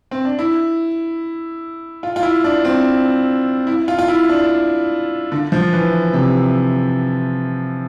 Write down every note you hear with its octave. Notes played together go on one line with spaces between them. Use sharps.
C4
D4
E4
F4
F4
E4
D4
C4
E4
F4
F4
E4
D4
D3
F3
E3
C3